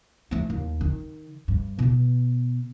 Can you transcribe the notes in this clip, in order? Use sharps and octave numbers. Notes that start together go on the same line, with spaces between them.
A3 E4
D#2
D#3
G2
B2 B3